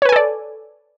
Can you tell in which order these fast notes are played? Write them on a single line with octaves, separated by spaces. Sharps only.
C#5 B4 G#5 A4 D5